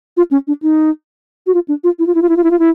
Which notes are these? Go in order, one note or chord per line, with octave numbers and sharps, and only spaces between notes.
F4
C#4
D4
D#4
F#4
F4
D4
F4
E4
F4
E4
F4
E4
F4
E4
F4
E4